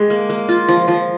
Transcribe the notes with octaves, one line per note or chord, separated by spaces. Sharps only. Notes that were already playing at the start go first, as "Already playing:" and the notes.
Already playing: G#3 G4
A#3
A#3
F4
F3
F3